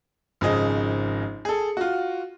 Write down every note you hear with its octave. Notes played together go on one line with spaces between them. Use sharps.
G#1 C#3 F3 G#4 D#5
G#4 A4
F4 F#4